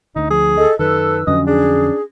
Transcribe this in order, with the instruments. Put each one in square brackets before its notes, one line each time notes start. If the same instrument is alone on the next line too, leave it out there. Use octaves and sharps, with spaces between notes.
[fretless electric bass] D2 D3 [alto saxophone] D#4
[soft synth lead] F3 [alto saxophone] G#4
[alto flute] A4 [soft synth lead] D#5
[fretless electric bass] F#2 D#3 [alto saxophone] A4 [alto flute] B4 [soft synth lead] E6
[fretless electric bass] F2 D3 F#3 [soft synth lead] C#4 [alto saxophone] D#5
[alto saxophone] D4 [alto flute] G#4